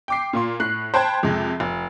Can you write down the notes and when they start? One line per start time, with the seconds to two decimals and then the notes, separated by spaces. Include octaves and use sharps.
0.08 G5 D6 C7
0.33 A#2 F4 C6
0.60 A2 F#6 C7
0.94 C5 G5 A5 B5 F#6 G#6
1.23 F2 C3 G#3
1.60 F1